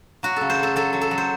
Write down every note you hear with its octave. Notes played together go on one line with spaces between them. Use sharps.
F#3 F#4
C#3 A4
C5
F#3 A4
F#3 A4
F#3
A4
F#3
C5